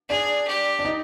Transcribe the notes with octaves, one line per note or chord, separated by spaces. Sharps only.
D4 G#4
G4
D4
D#4